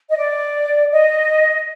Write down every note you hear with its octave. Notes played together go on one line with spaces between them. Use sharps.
D#5
D5
D#5